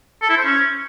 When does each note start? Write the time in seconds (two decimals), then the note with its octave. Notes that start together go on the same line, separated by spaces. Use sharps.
0.22 A4
0.30 E4
0.37 C5
0.45 C#4